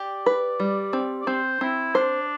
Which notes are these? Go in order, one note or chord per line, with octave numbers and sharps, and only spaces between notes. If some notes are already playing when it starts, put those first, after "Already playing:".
Already playing: G4 D5
B4
G3
C4
D5
C4 C5
C4 E4
D4 C5